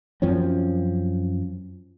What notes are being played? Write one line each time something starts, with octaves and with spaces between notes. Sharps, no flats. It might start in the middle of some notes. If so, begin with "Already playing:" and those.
F#2 F3 C4 C#4